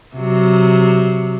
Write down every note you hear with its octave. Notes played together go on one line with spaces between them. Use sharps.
C3 F#3